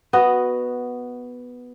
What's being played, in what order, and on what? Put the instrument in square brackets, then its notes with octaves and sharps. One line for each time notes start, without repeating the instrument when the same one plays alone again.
[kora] B3 F#4 D#5